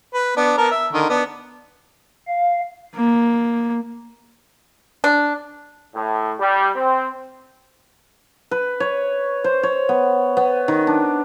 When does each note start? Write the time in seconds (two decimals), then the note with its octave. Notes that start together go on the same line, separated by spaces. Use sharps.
0.14 B4
0.37 B3 D4
0.57 B3 A#4 A5
0.71 E5
0.93 D3 D#3
1.09 B3 D4
2.28 F5
2.96 A#3
5.04 D4
5.95 A2
6.39 G3
6.75 C4
8.51 B4
8.80 C#5
9.44 C5
9.63 C#5
9.89 B3
10.37 B3
10.68 D#3
10.87 D4